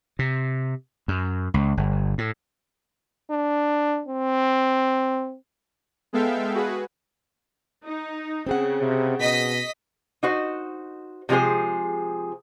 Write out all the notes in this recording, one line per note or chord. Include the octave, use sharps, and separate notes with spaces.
C3
F#2
C#2
G1
A2
D4
C4
G#3 B3 A4 E5 F5 G5
F#4 G#4 B4
D#4
C#3 C4 G#4 F#5
C3
B2 D#5 B6
D#4 F#4 C5
C3 F3 G#3 G#4 C5